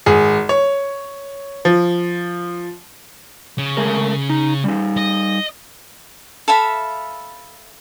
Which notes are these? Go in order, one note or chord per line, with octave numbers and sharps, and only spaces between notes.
G#1 G#4
C#5
F3
C#3
G#3 A3 A#4
D#4
G3 D#4
D#5
A4 E5 F5 B5